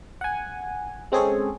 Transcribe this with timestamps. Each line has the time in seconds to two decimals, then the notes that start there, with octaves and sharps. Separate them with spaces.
0.21 F#5 G#5
1.12 G#3 C4 C#4 G#4 A4 C#5